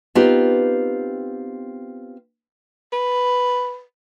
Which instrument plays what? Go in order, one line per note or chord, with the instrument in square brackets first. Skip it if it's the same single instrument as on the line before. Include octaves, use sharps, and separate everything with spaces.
[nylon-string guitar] B3 C4 D#4 F4 G4
[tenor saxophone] B4